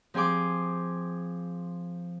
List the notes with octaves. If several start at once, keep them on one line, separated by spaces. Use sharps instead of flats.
F3 C4 G#4 C6 D6